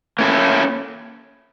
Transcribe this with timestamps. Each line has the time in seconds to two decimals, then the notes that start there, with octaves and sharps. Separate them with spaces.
0.19 A#3 C#4 E4 A4